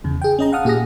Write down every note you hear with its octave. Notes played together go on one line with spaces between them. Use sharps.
E2 C#3
G#4 G5
C#4 D#5 A#5
F5 F#5 A5 D#6 F6
A#2 G4 G#4 F#5 D#6 A#6